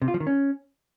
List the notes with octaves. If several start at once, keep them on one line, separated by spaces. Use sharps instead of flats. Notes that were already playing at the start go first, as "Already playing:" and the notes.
C3
F4
F3
D#3
C#4